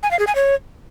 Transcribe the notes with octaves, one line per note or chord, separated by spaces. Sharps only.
G#5
F5
G#4
G#5
C#5